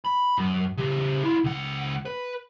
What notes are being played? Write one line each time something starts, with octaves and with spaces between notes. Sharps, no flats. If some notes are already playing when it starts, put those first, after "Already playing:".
B5
F#2
C#3 G4
E4 F4
C#2 F#5
B4